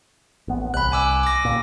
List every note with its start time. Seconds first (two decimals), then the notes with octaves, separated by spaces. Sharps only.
0.48 A1 B3
0.74 C2 B5 F#6
0.92 G#5 D6 E6
1.23 D6 A#6
1.45 C#2 A#2